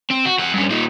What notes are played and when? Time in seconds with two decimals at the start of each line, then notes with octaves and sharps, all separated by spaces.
0.10 C4
0.25 F#4
0.39 F2 F#5
0.54 G2 C#4
0.70 A#2 D#4